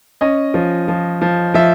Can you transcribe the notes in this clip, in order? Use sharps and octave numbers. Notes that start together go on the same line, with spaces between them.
C#4 D#5
F3
F3
F3
F3 E5